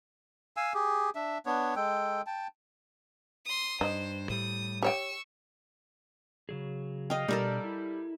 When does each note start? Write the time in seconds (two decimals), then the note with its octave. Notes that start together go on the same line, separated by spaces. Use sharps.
0.57 F5 G#5 E6
0.74 G4 G#4
1.15 D4 E5
1.46 B3 D4 C#5
1.76 G#3 A4 G5
2.27 G5 A5
3.45 C6 D#6
3.81 G2 D#4 C5
4.30 A2 G3 D#6
4.83 G4 C#5 G5 C#6 E6
6.49 C#3 F#3 G#4
7.10 D#5 F5 G5
7.28 B2 G3 D4 A4 A#4 D5
7.64 E4